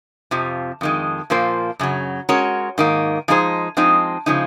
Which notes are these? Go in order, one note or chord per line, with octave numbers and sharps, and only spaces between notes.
F2 C3 F3
F2 D#3 G#3
A#2 F3 A#3 F4 C5
F#2 C#3 F#3
G#3 C#4 F#4 A#4 C#5
G#2 D#3 A#3
F3 G#3 D#4 G#4 C5
F3 G#3 C4 D#4
C#3 F3 G#3 D#4